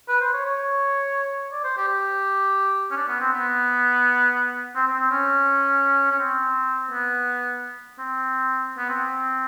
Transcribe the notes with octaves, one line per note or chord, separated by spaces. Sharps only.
B4
C5
C#5
C#5
D5
C5
G4
G4
C#4
D4
B3
C4
B3
C4
C4
C4
C#4
C#4
C4
B3
C4
B3
C4